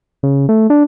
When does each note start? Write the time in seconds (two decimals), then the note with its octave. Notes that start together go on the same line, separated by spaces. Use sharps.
0.23 C#3
0.49 A3
0.70 D4